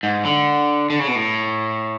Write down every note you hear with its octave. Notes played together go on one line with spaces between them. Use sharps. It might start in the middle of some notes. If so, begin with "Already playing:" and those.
G#2
D3
D3
C#3
B2
A2